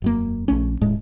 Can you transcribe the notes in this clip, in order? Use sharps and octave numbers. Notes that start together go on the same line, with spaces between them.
E1 F#2 A#3
A#1 A3 C#4
D#1 A2 G#3